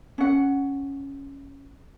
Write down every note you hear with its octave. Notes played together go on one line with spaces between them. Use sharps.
C#4 F#5